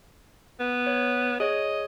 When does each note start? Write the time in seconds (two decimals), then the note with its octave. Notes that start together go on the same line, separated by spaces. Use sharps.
0.60 B3
0.87 C#5
1.40 G#4 C#5 D#5